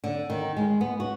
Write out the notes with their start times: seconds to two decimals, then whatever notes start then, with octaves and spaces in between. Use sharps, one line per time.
0.04 D3
0.30 D#3
0.57 G#3
0.81 B3
1.00 F#4